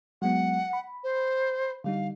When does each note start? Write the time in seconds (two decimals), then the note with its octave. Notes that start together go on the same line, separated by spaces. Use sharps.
0.22 F#3 G#3 B3 F#5
0.73 B5
1.04 C5
1.84 D3 G3 D#4 F5